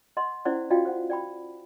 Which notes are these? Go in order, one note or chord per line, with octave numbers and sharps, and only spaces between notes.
D#5 F#5 C6
C#4 E4 C5 D5 F#5
F4 F#4 D5 D#5 F5 G5
C5 F#5
D5 G5 B5